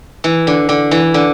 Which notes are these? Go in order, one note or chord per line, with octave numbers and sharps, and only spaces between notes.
E3
D3
D3
E3
D3